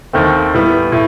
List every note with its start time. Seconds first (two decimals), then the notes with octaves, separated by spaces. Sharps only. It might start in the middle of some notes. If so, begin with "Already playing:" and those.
0.13 D#2 D#3 A3 C4
0.53 A2 E3 G3 B3
0.92 A2